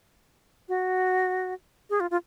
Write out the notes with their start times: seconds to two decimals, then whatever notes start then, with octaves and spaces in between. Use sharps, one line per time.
0.69 F#4
1.90 G#4
2.00 F4
2.11 F4